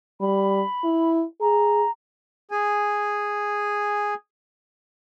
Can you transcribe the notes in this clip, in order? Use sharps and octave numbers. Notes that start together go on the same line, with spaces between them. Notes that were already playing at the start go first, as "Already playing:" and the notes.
G3 B5
E4
G#4 A#5
G#4 G#5